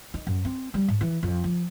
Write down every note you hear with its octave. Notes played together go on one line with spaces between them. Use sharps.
D#4
F#2
C4
G3
G#2
E3
F2
F3